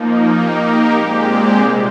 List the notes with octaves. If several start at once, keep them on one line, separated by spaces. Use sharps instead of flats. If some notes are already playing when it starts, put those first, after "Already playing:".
Already playing: F3 A#3 D#4
A#3 D#4 G4 A#4
A#2 G#3 C4 G4
C3 G3 A#3